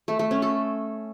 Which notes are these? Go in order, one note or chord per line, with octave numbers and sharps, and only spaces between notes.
A3
A3
C#4
A4